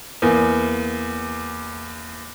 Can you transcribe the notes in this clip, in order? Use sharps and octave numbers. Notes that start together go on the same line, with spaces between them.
E2 A#3